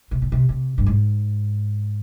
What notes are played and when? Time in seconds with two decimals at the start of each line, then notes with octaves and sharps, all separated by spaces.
0.11 C3
0.22 C#3
0.32 C3
0.49 C3
0.78 G2
0.86 G#2